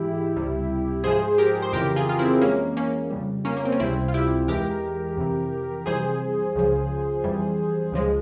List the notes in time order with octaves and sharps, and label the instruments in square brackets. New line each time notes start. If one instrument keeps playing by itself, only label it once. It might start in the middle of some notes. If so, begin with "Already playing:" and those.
Already playing: [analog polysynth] G#2 E3 G#3 E4 G4
C#2 C3 G3
G#2 F3 G#3 G#4 C5
G4 A#4
C5
F2 C#3 E3 G4 A#4
F4 G#4
F4
C4 E4
F2 E3 G#3 A#3 C#4
A#3 C#4
F2 C#3 G3
A#3 C#4
A#3
C4
C#4
C#2 C3 G3 C4 E4
F4
E4 G4
E2 E3 G#3 G4 A#4
F2 C3 E3
F2 C3 E3 G3 G#4 C5
C#2 C#3 F3
F2 E3 G3
C#2 C#3 F3 G#3